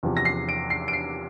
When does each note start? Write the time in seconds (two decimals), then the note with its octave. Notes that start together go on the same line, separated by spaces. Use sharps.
0.03 E2 C3 F3
0.17 A#6
0.25 C7
0.49 D7
0.70 C7
0.88 D7
0.93 C7